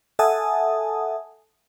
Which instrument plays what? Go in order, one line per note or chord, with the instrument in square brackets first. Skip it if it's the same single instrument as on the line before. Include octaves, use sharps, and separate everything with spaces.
[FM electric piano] A4 E5 F#5 G#5 A5 D#6